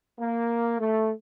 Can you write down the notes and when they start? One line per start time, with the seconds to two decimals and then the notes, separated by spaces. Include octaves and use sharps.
0.18 A#3
0.79 A3